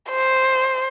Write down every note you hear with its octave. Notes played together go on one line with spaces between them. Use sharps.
C5